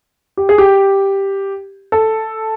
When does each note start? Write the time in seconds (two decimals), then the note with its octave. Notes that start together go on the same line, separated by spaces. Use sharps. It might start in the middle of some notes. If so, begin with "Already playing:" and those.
0.37 G4
0.49 G#4
0.58 G4
1.92 A4